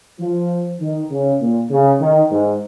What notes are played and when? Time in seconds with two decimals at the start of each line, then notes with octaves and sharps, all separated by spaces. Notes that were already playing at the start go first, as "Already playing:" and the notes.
0.20 F3
0.81 D#3
1.11 C#3
1.41 A#2
1.70 C#3
2.01 D#3
2.31 G#2